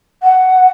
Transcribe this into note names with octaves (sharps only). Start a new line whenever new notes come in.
F#5